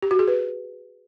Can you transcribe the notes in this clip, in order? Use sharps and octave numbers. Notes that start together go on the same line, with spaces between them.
G4
F#4
G#4
B4